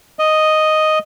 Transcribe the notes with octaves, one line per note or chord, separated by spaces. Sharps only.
D#5